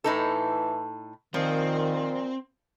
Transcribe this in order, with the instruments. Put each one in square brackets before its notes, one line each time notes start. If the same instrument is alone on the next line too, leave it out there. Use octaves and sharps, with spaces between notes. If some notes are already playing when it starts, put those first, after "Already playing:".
[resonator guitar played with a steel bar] A2 D#4 A4 [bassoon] E3
[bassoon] A#2 [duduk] D#3 [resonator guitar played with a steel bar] F3 [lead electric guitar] C4